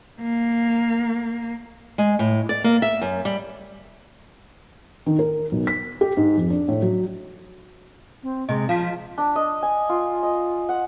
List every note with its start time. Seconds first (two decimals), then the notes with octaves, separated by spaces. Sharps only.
0.21 A#3
1.98 G#3
2.19 A2
2.49 D5
2.64 A#3
2.82 E5
3.01 F#2
3.25 G3
5.06 D#3
5.19 A#4
5.52 B1
5.67 B6
6.01 G4
6.17 G#2
6.37 F2
6.50 D4
6.68 A2
6.82 F#3
8.23 C4
8.49 C3 G#3 D#5
8.69 F3 F4 F5 A5 B6
9.18 D4
9.36 D#5
9.63 G#5
9.89 F4
10.23 D#5
10.69 F#5